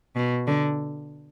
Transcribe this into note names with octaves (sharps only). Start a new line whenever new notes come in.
B2
D3